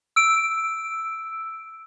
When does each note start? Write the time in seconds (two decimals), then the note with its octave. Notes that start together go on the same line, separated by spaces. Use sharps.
0.16 E6 D7